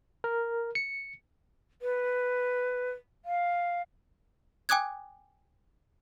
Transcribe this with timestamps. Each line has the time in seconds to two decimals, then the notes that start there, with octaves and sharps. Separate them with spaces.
0.24 A#4
0.75 C#7
1.82 B4
3.25 F5
4.69 G5 G#5 D6 D#6 F#6 G#6